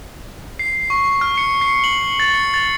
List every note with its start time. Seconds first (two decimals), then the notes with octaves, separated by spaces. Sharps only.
0.59 C7
0.90 C#6
1.21 F6
1.38 C#7
1.61 C7
1.84 F#7
2.20 A6
2.34 C#7
2.54 A6